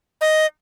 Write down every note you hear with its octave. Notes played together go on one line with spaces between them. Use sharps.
D#5